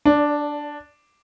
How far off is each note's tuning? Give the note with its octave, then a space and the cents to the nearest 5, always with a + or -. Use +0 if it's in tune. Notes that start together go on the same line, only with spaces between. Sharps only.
D4 +0 D5 -25